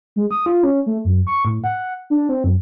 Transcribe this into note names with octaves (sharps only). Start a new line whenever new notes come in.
G#3
D#6
F4
C#4
A3
F#2
C#6
A2
F#5
D4
C4
F#2